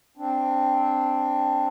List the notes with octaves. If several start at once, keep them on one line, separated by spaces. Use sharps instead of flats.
C4 D4